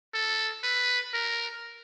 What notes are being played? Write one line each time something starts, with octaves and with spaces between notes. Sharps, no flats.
A4
B4
A#4